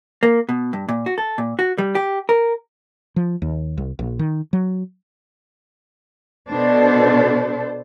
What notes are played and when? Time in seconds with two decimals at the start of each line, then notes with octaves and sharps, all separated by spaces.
0.23 A#3
0.49 B2
0.73 G2
0.89 A#2
1.06 F#4
1.18 A4
1.38 A#2
1.59 F#4
1.78 G3
1.95 G4
2.29 A#4
3.16 F3
3.42 D#2
3.78 C2
3.99 A#1
4.19 D#3
4.53 F#3
6.49 B2 D4 A4 C5